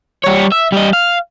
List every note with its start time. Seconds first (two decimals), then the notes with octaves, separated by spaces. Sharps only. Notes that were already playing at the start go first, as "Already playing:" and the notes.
0.24 G3 C#5
0.52 E5
0.72 G3 D#5
0.93 F5